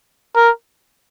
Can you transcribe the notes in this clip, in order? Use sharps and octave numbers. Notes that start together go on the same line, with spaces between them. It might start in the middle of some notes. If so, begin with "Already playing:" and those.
A#4